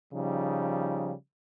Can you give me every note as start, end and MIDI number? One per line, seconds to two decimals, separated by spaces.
0.13 1.13 49
0.13 1.13 53
0.13 1.13 55
0.13 1.13 63